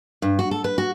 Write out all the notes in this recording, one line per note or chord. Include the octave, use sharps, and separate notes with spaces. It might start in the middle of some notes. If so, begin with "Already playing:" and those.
G2
F#4
A4
B4
F#4